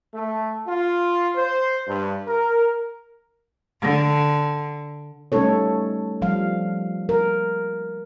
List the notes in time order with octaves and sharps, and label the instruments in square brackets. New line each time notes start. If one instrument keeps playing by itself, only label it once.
[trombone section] A3
F4
C5
G2
A#4
[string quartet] D3
[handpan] G3 A3 C#4 D#4 A4 C#5
F3 G3 F5
A#4